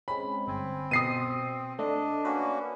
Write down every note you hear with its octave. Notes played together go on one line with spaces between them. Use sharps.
G#3 C4 C#4 B5
G1 C4 G#5
B2 D#6 C7 D#7
A3 D4 D#5
A#3 C#4 F#4 B4